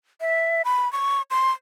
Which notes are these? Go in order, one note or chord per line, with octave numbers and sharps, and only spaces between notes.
E5
B5
C#6
C6